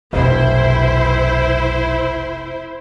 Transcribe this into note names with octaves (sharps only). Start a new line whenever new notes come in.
F1 B1 E4 C5